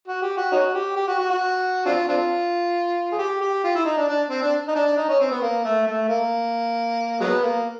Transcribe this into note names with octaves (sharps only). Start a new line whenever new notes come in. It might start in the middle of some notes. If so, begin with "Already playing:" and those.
F#4
G4
F#4
C#4 D#4 F#4
G4
G4
F#4
F#4
F#4
C4 D4 F4
C4 D4 F4
G#4
G4
G4
F4
E4
D#4
D4
D4
C4
D4
D#4
D4
D#4
C#4
C4
B3
A#3
A3
A3
A#3
F#3 G#3 B3
A#3